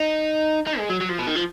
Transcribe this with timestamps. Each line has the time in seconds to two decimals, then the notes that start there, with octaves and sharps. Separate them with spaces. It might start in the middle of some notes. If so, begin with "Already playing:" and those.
Already playing: D#4
0.67 D#4
0.78 G#3
0.89 F#3
1.01 F#3
1.09 F3
1.18 B2
1.27 D#3
1.35 F3